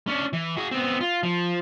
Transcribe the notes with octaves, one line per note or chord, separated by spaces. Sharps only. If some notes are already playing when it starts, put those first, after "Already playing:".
C#4 D4
E3
F#4 G#4
B3 C4
F4
F3